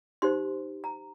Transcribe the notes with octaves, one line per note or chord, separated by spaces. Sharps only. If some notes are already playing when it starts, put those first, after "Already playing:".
D#4 G4 C5 C6
A#5